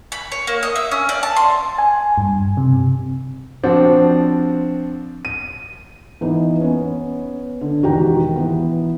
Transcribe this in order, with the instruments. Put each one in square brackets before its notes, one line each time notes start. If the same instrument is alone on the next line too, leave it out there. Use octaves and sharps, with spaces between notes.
[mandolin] B5
C#5
A#3
D#5
E5
C#4
D5
A5
C6
[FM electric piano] G#5
G2
C3
[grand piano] F3 C4 D4 F#4
D#7
[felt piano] E3 B3 D#4
B3 C#4
D3
E1 D#3 F#4 G4 G5 A#5
E3 B3